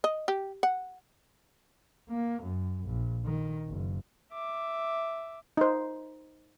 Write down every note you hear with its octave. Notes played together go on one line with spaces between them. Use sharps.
D#5
G4
F#5
A#3
F#2
A#1
D#3
F#1
E5 D6
D#4 C5